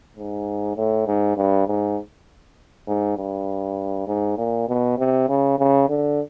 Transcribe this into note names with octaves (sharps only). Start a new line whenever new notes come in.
G#2
A2
G#2
G2
G#2
G#2
G2
G#2
A#2
B2
C3
C#3
C#3
D3